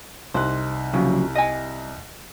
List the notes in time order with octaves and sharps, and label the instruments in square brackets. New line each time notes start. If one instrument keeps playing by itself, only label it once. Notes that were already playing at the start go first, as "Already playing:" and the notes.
[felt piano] C2 D#4 F#6 [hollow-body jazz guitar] C5
[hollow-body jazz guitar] C#3 F3 F#3
D#5 G#5